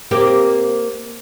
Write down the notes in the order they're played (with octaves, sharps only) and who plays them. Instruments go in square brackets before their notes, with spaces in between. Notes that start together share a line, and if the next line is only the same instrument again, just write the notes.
[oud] A#3 C4 G4